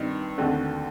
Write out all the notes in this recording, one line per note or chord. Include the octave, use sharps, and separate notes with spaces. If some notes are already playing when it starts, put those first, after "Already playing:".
Already playing: G2 D#3 C4 D#4
D#2 D3 A3 C4 F#4